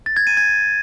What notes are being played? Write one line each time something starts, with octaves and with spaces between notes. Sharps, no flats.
A6
G#6
D#7
G#6